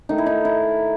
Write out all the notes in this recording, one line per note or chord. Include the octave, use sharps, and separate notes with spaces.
D#3 A3 D#4
E4
D#4
E4